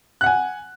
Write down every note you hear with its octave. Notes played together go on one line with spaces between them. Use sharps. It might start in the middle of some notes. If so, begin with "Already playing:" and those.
F#5 G#5 F#6